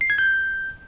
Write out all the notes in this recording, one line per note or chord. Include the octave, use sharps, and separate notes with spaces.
C7
G#6
G6